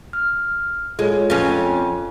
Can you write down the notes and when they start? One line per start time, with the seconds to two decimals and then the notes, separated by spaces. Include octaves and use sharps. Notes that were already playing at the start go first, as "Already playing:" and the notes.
0.13 F6
0.99 G#3 F4 A4 C#5
1.30 F2 C#4